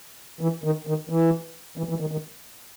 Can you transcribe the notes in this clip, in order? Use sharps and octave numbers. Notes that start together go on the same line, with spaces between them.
E3
D#3
D#3
E3
E3
E3
D#3
D#3